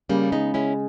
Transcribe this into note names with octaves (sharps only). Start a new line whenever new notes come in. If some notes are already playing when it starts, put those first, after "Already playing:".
C#3 G3 A#3
G#3 B3 D#4
G#3 C#4 E4